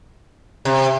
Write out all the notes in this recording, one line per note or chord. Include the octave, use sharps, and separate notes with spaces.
C3